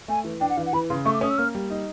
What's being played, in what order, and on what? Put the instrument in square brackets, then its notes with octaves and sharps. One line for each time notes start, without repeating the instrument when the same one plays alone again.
[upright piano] A3 [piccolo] G#5
[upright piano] E3
[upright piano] D4 [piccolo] G5
[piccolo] F#5
[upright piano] E3 [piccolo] F5
[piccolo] F#5
[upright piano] E3 [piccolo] B5
[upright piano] C#3 [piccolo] C6
[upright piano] A3 [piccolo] C#6
[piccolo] D6
[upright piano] C#4 [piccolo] D#6
[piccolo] E6
[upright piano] A#3 [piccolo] F6
[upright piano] G3
D#4